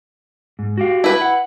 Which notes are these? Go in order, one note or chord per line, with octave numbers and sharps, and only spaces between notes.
G#2
F#4 G4 F5
E4 B4
F#5